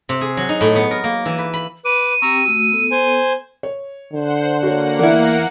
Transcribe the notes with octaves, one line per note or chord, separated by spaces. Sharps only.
C3
G#4
F#3
D#4
A2
B3
A#4
A#3
E3
B4
B5
B4 D6 D#7
C4 G4 G5 A#5 C#6 E6
A3 F#4 E6
B3 A4
C5 G#5
C#5
D3 C5 F#5
A#3 F#4 C#5 F#5
E2 E4 A#4 D5